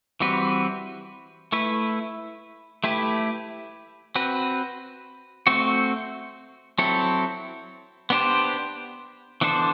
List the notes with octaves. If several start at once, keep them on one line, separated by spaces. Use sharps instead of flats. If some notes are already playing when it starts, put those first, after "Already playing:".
E3 G3 C4 F#4 B4
A3 E4 B4
A3 E4 G4 B4
C4 F#4 B4
A3 C4 F#4
F#3 C4 E4 A4
B3 D4 G4 C5
E3 B3 D4 A4 C5